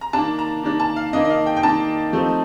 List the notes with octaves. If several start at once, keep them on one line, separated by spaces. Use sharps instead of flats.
A#5
D#3 A#3 D4 A5
A#5
D#3 A#3 D4
A5
F5
D#3 A#3 D4 D#5
D#5
F5
G5
G5
D#3 A#3 D4 A5
F3 A3 C4 D#4